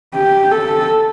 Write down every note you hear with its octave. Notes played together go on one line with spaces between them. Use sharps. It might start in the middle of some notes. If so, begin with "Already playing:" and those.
G4
A4